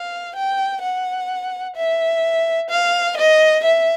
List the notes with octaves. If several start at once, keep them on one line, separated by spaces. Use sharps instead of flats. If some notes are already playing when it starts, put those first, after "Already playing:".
Already playing: F5
G5
F#5
E5
F5
D#5
E5